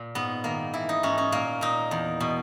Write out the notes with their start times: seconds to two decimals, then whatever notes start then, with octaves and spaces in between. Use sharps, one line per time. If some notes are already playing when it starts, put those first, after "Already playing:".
Already playing: A#2
0.15 G#2 B3
0.44 D#3 A#3
0.74 E3 E4
0.89 D#4
1.03 G#2 C#4
1.18 C#4
1.32 A#2 A#3
1.61 A#2 D#4
1.91 E2
2.20 B2